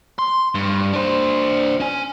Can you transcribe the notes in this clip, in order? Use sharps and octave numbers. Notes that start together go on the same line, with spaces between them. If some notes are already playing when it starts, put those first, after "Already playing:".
C6
G2
D4 C5
C#4 G#5